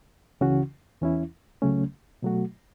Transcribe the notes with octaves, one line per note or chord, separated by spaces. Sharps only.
C#2 C#3 E3 C#4 F#4
E2 E3 C#4 E4
C#2 C#3 F#3 A3 C#4
B2 F#3 A3 F#4